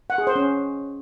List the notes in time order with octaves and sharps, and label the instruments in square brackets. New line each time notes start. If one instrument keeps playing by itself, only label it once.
[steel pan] F#5
G#4
C5
C#4